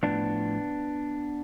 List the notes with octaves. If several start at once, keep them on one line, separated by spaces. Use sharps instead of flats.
A2 F3 B3 D4